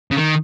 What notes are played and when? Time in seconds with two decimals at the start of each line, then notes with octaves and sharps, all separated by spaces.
0.11 C#3
0.16 D#3